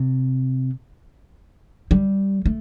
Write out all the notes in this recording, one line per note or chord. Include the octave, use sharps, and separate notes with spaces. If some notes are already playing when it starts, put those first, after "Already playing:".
Already playing: C3
G3
A3